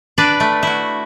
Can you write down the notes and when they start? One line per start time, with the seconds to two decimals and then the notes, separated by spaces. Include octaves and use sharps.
0.18 D4 B4 D5
0.40 A3
0.63 E4 F#4